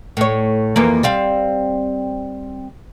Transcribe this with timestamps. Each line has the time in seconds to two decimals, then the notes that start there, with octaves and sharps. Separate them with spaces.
0.17 A2 C#5
0.76 F2 E3 A#3
1.03 G3 C4 F5